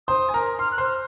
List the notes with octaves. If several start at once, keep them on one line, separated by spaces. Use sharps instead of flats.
C5 C6 D#6
G#5
A#4 A#5
C6 F6
F#6
C5 C6
F6